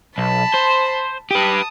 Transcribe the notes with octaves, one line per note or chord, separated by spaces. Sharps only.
B1 A5 B5
C5
G4 B4 A5 D#6